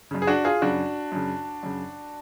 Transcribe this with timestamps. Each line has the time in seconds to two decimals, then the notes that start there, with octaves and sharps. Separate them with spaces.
0.11 F#2 C#3
0.22 G#4
0.27 D4 F#4
0.44 F4 G#4
0.62 F#2 C#3 D4 F#4
1.12 F#2 C#3
1.63 F#2 C#3